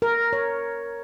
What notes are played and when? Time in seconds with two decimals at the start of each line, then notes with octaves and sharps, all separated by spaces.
0.02 A#4
0.33 C#5